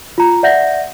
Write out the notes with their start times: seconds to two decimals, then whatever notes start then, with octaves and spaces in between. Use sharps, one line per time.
0.18 F4 A#5
0.43 D5 E5 F#5 G6 A#6